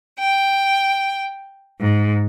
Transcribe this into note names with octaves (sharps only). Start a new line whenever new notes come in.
G5
G#2